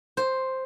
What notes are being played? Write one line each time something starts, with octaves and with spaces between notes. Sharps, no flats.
C5